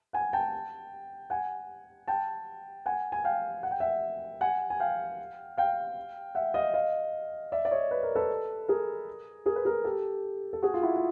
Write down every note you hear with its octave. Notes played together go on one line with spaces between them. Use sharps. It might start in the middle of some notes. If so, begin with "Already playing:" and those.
F#5 G#5
G5 A5
F#5 G#5
G5 A5
F#5 G#5
G#5
F5 G5
F#5
G5
E5 F#5
F#5 G#5
G#5
F5 G5
F5 G5
E5 F#5
D#5 F5
D#5 F5
D5 E5
D5
C#5 D#5
B4
A#4
A4 B4
G#4 A#4
G#4 A#4
B4
G#4 A#4
G4 A4
A4
F#4 G#4
F4
E4 F#4
F4